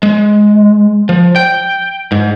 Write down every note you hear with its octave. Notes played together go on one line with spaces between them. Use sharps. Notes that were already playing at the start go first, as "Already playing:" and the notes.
G#3
F3
G5
G#2